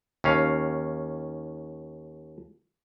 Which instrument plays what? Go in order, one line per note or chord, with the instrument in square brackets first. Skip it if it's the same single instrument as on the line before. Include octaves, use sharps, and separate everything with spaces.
[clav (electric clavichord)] D#2 C#4 F5